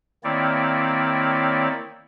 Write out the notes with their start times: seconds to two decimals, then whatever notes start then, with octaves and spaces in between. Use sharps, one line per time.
0.24 D#3 A#3 C4 E4 C#5 D5